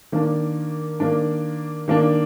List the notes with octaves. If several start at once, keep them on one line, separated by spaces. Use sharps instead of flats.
D#3 A#3 D4
D#3 A#3 D4
D#3 A#3 D4